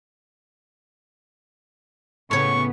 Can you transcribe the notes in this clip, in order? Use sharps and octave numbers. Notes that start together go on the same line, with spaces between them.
A2 C#3 B3 C#5 C#6